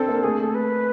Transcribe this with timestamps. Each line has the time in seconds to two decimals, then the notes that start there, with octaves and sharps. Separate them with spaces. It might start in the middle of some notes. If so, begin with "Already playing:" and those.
Already playing: C4 D4 A4
0.08 A#3
0.23 A3 G#4
0.40 A4
0.54 B4